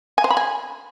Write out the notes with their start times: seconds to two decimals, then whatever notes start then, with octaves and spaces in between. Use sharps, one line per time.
0.18 G#5
0.24 C5
0.31 B5
0.37 G#5